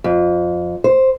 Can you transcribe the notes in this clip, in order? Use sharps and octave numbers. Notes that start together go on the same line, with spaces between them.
F2
C5